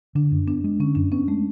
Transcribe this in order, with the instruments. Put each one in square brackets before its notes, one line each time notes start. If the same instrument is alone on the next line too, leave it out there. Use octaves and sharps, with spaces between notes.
[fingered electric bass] D3 [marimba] D4
[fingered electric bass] F#2
[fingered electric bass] B3 [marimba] D4
[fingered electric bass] G#3
[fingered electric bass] D3 [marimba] C#4
[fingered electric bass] F#2 [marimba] D4
[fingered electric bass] B3 [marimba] C#4
[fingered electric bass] G#3 [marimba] A3